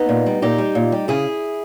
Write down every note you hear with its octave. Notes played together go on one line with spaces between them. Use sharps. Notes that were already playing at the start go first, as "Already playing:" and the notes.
Already playing: B3 D#4
A#2
G3
A#2 D#4 G4
G3
A#2
G3
C#3 E4 G#4